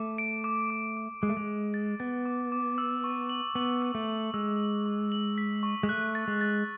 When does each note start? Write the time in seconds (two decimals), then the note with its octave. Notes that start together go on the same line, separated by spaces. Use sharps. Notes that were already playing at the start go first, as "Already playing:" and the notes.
Already playing: A3 D6
0.18 D7
0.44 D6
0.70 D6
0.97 D6
1.22 G#3 D6
1.29 A3
1.37 G#3
1.48 D7
1.74 A6
2.00 B3 A6
2.26 D6
2.52 D6
2.78 E6
3.04 C#6
3.29 F#7
3.55 B3 F#7
3.82 E6
3.95 A3
4.08 E6
4.34 G#3 E6
4.60 F#7
4.86 C#6
5.12 F#7
5.38 B6
5.63 C#6
5.83 G#3
5.89 A3 F#6
6.15 A6
6.28 G#3
6.41 A6